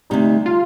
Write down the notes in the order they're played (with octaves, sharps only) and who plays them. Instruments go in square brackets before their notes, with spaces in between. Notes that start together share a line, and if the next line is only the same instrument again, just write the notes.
[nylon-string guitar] D2 C3 G3 [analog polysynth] D#4
[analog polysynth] F4